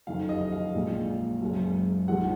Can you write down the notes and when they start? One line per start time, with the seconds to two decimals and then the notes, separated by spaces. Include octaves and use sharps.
0.07 F#1 F2 D#3 F5
0.29 D#5
0.52 F5
0.74 A#1 A#2 G#3
1.41 F#1 F#2 C#3 G#3
2.08 A#1 G#2 F3 G#3 F#5